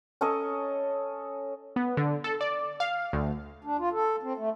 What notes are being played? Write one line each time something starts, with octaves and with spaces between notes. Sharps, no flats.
C#4 A4 C#5 D#5
B3
D3
A4
D5
F5
D2
D4
F4
A4
C4
A3